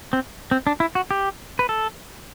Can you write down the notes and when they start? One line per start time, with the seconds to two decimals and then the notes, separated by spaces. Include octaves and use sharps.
0.13 C4
0.51 C4
0.67 D4
0.80 E4
0.95 F#4
1.11 G4
1.59 B4
1.69 A4